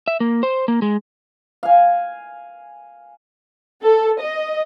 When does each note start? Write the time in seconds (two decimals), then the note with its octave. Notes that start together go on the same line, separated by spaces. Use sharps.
0.08 E5
0.20 A#3
0.43 C5
0.68 A#3
0.82 G#3
1.63 F5 G#5
3.82 A4
4.20 D#5